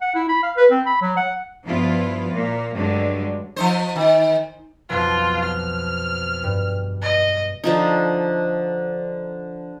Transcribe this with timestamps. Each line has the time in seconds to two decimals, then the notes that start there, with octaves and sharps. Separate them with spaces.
0.01 F#5
0.15 E4
0.29 B5
0.43 F5
0.57 B4
0.71 C4
0.86 B5
1.01 F#3
1.17 F#5
1.66 G2 F3 B3 E4 F4
2.34 A#2 A#3
2.76 G2 D3 F#3 G#3 A3
3.56 F3 D#4 C5
3.96 D#3
4.90 B1 F2 F4
5.44 F6
6.44 G2
7.02 D#5
7.64 D3 F3 D#4